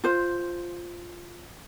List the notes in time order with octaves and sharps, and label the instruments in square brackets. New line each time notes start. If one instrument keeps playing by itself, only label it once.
[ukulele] F4 C5